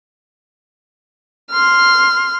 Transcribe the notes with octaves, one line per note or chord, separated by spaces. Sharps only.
C6 F6